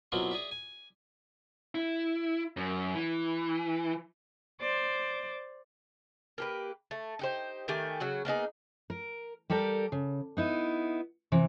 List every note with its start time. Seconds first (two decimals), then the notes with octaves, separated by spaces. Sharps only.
0.12 B2 F#3 A#3 C4 E4 F4
0.31 G#4 D5 E5
0.51 G#5
1.75 E4
2.57 F#2
2.95 E3
4.60 C5 D5
6.38 A#3 G4 B4
6.91 A3
7.19 D#4 G4 C5
7.68 D#3 A3 G4 G#5
8.00 C#3 F#3 F#4
8.25 A#3 B3 D#4 G#4
8.90 A#4
9.50 G3 G4 A4 A#4 D5
9.92 C#3
10.37 B3 D#4 E4
11.32 C3 E3